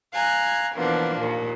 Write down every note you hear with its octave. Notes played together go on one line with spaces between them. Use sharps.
F5 G#5 A#5 F#6 G#6
B2 E3 F3 A#3 D4
D#2 A#2